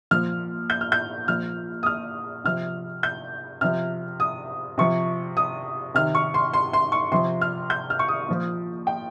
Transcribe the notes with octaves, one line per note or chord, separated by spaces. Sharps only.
A#2 F3 F6
G6
F6
G6
A#2 F3 F6
D#6
F6
C3 F3 F6
G6
C3 F3 F6
D#6
C3 F3 C#6
D#6
C3 D#3 F6
C#6
C6
C6
C6
C#6
C3 F3 C6
F6
G6
F6
C#6
D#6
A#2 F3
G5